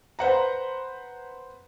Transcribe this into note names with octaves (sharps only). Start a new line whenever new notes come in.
B4 C5 F#5 A#5